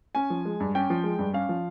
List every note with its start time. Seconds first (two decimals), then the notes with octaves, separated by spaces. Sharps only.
0.15 C#4 G#5
0.30 F3
0.45 G#3
0.60 G2
0.75 C#4 G5
0.90 F3
1.04 G#3
1.19 G2
1.34 C#4 F5
1.49 F3